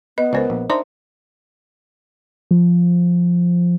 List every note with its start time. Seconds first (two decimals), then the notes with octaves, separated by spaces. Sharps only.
0.18 B3 B4 D#5
0.33 C#2 A#4 C5 D5 G#5
0.50 A#1
0.70 D4 D#4 C5 E5 C6
2.51 F3